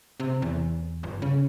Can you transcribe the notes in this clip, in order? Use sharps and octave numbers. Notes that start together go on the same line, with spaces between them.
C3
E2
G1
C#3